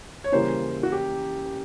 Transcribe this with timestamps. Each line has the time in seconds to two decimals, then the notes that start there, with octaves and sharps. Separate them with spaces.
0.24 C#5
0.32 C#3 E3 G3 A#3 C#4 C5
0.83 F#4
0.92 G4